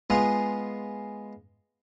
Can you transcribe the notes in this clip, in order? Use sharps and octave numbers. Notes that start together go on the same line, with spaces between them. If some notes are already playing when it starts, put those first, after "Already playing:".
G#3 B3 F4 G#4 F5